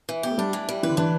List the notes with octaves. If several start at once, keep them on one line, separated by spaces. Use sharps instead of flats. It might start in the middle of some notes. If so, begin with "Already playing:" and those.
E3
B3 G4
A3
G3 D4
E3
G3
E3 B4
D3
E3 D4